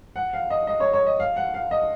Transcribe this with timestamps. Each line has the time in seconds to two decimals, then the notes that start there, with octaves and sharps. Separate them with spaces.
0.16 F#5
0.33 F5
0.50 D#5
0.67 D#5
0.80 C#5
0.93 C#5
1.06 D#5
1.20 F5
1.36 F#5
1.54 F5
1.71 D#5